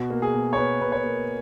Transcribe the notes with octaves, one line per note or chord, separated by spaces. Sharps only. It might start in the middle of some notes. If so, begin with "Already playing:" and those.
Already playing: B2 F#4
A#3
G#4
B2
C#5
A#3 B4
B2 B4
C#5
A#3